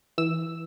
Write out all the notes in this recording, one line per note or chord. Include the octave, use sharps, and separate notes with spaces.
E3 E6